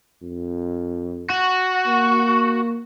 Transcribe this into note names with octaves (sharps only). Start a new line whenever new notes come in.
F2
F#4
A#3